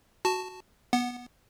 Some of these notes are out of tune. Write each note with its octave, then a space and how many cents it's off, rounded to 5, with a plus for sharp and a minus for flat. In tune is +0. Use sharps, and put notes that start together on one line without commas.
F#4 +0 A5 +0
B3 -20 F#5 +0